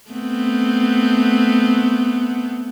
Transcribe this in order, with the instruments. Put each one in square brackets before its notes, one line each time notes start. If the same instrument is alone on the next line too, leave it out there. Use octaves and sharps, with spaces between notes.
[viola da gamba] A3 B3 C4